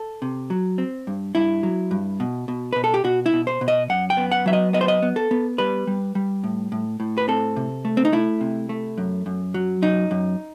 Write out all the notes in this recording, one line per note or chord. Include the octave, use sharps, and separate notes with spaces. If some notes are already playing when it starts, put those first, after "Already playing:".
Already playing: A4
C3
F#3
C4
G2
G2 E4
F#3
G2
B2
B2
B2 B4
A4
G4
B2 F#4
E4
B2
C5
B2
D#5
F#2 F#5
G5
B3
F#5
F#3 E5
D#5
B3 D#5
C5
D#5
B3
A4
B3
G3 B4
G3
G3
A2
A2
A2
B4
C4 A4
C3
A3
C4
D#4
A3 E4
C3
A3
F#2
F#2
F#3
F#2 D#4
F#2